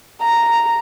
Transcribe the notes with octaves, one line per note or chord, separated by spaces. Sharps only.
A#5